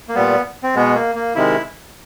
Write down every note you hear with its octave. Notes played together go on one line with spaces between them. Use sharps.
A#3
A#2 G3 B3
C4
B2 G#3 B3
A#3
A#3
C3 D#3 G#3 E4